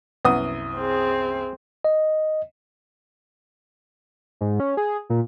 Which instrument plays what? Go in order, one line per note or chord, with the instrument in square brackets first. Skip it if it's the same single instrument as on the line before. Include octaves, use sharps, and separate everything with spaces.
[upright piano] C2 F#2 D#6 [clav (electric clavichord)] B3
[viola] C4 G#4
[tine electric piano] D#5
[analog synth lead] G#2
C#4
G#4
A#2